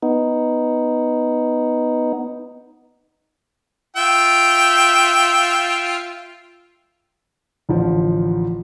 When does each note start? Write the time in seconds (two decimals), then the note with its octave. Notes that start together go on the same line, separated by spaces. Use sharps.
0.02 B3 D#4
3.97 F4 E5 G5
7.69 A1 D3 F3